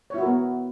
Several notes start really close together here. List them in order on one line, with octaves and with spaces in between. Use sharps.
C#5 E4 F#4 A#4 B3